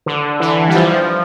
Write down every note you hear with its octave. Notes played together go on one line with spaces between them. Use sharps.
D3
E3
G3
F3